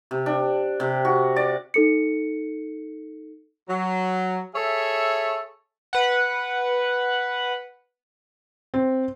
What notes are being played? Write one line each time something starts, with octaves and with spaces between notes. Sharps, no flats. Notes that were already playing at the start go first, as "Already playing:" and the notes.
C3
D4
C3
F#4
D5
D#4 A4 C#7
F#3
G#4 A4 C#5 E5
B4 F#5
C4